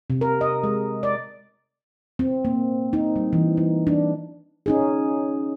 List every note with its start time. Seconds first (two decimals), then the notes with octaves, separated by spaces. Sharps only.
0.10 C3
0.21 A#4
0.41 D#5
0.63 G#3
1.03 D5
2.19 C4
2.45 A#3
2.93 D#4
3.16 G3
3.33 E3
3.57 D#4
3.87 D4
4.66 C#4 D#4 G#4